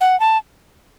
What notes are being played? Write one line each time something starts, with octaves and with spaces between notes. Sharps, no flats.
F#5
A5